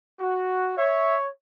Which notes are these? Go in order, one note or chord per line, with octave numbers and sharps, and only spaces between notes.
F#4
C#5 E5